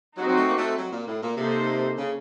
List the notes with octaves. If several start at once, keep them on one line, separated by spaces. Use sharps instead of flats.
F#3 C4 D#4 F#4
F#3
A3
A#3
A3
F#3
A#2
A2
A#2
C3 A#3 D#4 A4 C5
C#3